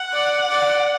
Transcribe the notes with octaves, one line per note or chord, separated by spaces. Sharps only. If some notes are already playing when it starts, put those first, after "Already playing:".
Already playing: F#5
D5
D5